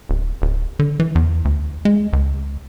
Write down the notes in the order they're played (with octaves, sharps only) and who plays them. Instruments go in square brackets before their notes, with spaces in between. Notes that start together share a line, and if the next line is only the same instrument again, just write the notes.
[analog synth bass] D1
D1
D3
E3
E2
D2
G#3
C#2